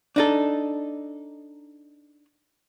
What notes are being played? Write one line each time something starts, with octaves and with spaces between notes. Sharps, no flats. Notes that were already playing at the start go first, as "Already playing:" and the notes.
D4 D#4 A4